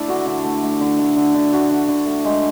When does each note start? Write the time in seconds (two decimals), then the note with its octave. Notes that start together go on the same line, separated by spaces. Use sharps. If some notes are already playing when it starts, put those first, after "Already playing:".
Already playing: A3 D4 E4
0.08 D3 F#4
0.26 D3
0.44 A3
0.63 A3
0.80 D3
0.99 A3
1.17 D3
1.35 D3
1.53 A3 F#4
1.71 D3
1.88 D3
2.06 A3
2.25 G#3